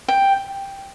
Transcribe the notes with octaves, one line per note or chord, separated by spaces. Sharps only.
G5